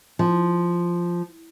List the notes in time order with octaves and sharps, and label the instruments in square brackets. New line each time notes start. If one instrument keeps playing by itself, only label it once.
[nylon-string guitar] F3